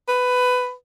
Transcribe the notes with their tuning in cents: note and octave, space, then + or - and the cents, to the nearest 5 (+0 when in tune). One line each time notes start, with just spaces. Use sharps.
B4 +15